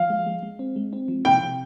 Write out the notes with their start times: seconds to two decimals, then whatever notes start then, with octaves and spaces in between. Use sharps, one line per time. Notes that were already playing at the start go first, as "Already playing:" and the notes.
Already playing: F3 F5
0.10 G#3
0.26 G#3
0.43 G#3
0.59 C4
0.76 G#3
0.93 C4
1.08 F3
1.25 C3 G5
1.41 C3